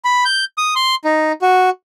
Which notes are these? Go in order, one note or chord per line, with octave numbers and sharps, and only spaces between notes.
B5
G6
D#6
C6
D#4
F#4